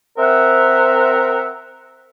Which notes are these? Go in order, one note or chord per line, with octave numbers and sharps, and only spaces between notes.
C4 A#4 E5 F#5